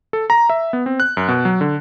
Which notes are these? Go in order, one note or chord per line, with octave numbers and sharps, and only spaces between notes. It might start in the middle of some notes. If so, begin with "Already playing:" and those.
A4
A#5
E5
B3
C4
F#6
F#2
B2
F#3
D3